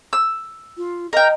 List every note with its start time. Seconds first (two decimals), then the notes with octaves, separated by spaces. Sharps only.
0.13 E6
0.78 F4
1.13 A#4 D#5 G5